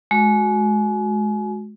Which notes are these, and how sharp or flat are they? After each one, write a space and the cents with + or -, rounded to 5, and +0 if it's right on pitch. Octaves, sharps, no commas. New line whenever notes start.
G#3 +30 F#4 -15